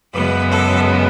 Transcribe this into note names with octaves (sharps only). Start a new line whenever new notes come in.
F#2 C#3 G#3 B3 B4
A4